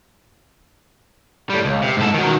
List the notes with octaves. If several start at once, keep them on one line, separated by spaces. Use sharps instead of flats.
A2 G3
C#2
C3
G#2 A4
D#3 F#3